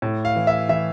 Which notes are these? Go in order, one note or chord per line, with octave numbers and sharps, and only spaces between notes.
A2
F5
E3
E5
E3 E5